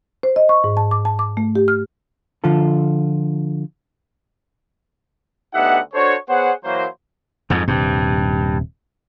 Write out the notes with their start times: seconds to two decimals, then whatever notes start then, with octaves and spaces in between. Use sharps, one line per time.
0.23 C5
0.36 D#5
0.49 C#6
0.64 G#2
0.77 A5
0.91 D6
1.05 A5
1.19 D6
1.37 A3
1.55 G4
1.68 F6
2.44 D3 F3 F4 A4
5.54 D2 B3 D#4 G4 E5 F#5
5.94 D4 F#4 A4 C5 C#5
6.28 B3 G#4 C5 C#5 F#5
6.65 E3 F#3 A#3 C5
7.50 F2 G#2 F3
7.68 D#1 G2 C3